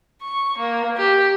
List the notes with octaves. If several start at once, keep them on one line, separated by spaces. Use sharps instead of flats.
C#6
A#3
G4